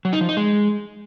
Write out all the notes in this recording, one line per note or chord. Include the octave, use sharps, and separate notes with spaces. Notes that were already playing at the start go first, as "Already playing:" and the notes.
F#3
D#4
F3
D#4
G#3